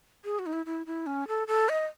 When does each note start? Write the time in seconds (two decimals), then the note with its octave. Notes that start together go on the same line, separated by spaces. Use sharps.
0.25 G#4
0.39 F#4
0.46 D#4
0.53 E4
0.66 E4
0.86 E4
1.07 C#4
1.28 A4
1.48 A4
1.69 D#5